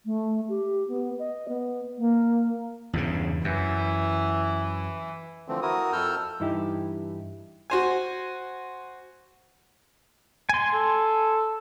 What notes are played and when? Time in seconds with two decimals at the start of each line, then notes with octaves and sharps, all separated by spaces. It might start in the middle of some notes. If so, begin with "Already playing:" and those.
0.05 A3
0.48 G4
0.87 B3
1.18 D#5
1.48 B3
1.97 A#3
2.93 E2 G2 C#3
3.44 F#2 E3
5.48 D3 E3 F3 A3 C4
5.62 E4 F#4 A#4 D#6
5.93 F2 A4 E6 F6 G6
6.40 G2 E3 D#4 E4 G4
7.70 F#4 C5 G#5
10.49 G#5 C6
10.74 A4